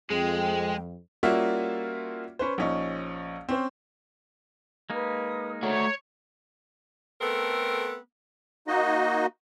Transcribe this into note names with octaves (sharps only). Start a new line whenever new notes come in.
F2 G#3 G#4 G5
G3 A#3 C#4 F4 F#4 E5
C#4 B4 C5
A#1 C#4 D#4
C4 C#4 C5
G#3 A#3 D#4 B4 D#6
A3 F#4 C#5 A#5
A3 B3 C4 A4 A#4
A#3 D#4 F#4 D#5